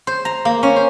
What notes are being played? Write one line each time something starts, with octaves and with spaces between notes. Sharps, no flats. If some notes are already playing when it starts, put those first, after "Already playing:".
C5
A#5
A#3
C#4
C5